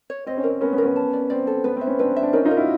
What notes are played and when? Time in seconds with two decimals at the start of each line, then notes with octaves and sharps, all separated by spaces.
0.10 C#5
0.26 C4 D#5
0.37 C#4
0.44 C4 A#4
0.61 B3 C#4 A#4
0.73 B3 C#4
0.78 A#4
0.84 B3 C#4
0.96 A5
1.13 D5
1.30 C4 D5
1.47 A4
1.64 B3 B4
1.76 C4
1.81 E5
1.87 B3 C#4
1.99 C4 D4 B4
2.16 E5
2.23 D4
2.33 C#4 D#4 A#4
2.45 D#4 F4
2.51 A#4
2.57 E4 F#4